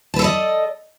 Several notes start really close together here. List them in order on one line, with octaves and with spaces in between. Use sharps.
A5 B4 A4 D5 D#5